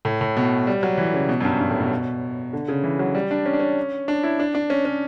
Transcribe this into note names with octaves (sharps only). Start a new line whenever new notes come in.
A2
A2
B2
G3
F#3
E3
C#3
B2
F#2
G2
G2
A2
B2
D3
C#3
E3
F#3
G3
D4
C#4
D4
C#4
D4
E4
D4
D4
C#4
C#4